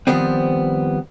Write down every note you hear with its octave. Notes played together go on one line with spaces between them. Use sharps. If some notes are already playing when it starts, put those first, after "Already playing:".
D#3 F3 G3 B3 C4